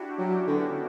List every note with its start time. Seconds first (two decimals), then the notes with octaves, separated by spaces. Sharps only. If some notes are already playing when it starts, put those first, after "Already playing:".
Already playing: D4 E4 F#4 G4
0.18 F#3 C#4 E4
0.46 D3 B3 D4